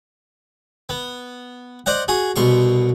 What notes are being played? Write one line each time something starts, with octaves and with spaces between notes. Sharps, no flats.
B3
C5 D5 D#5 F#5
F#4 G#4
C2 B2 C6 C#6